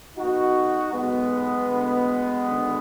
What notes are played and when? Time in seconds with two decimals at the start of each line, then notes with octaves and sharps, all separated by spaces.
0.18 B1 B2 D#4 F#4
0.93 B1 B2 G#3 B3
1.68 D2 D3
2.44 G#1 F#2 D3